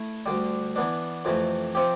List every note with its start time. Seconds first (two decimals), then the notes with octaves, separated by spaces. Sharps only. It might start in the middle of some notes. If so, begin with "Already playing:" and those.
Already playing: A3 E4
0.26 D2 D3 G3
0.76 E3 B3 D4
1.25 F2 C3 E3 A3
1.75 C3 F3 C4 G4